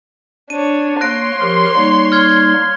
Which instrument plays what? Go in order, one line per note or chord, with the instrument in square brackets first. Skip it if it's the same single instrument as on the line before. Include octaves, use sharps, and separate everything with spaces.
[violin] D4 C#5 [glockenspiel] D#7
[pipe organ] A#3 [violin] C#5 C6 [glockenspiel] F#6 A#6 D7
[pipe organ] F3 G4 A#4
G3 A#3 D#4
[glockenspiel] F6 G#6 G7